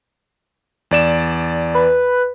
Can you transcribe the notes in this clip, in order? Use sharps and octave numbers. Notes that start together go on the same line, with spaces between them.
E2 D5 E7
B4